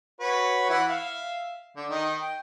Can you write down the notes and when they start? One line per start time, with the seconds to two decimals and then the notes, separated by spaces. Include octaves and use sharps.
0.21 F#4 B4 C#5
0.70 E3 E4 F#5
0.89 E5 F5
1.77 D3
1.90 D#3 D#4
2.21 G5